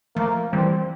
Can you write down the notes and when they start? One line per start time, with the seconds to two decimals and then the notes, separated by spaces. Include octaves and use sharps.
0.16 F3 A3 A#3
0.52 E3 G3 C4